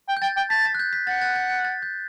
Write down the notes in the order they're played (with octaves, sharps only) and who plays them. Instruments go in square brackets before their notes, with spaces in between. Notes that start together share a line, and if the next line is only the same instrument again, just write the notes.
[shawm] G5
[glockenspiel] G6
[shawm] G5 [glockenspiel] A6
[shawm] G5
[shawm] A5 [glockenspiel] B6
[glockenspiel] A6
F#6
G6
B6
[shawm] F#5 [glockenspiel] A6
[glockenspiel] A6
A6
A6
A6
G6